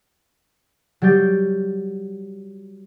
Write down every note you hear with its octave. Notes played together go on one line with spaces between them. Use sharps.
F#3 G3 G4 G6 A6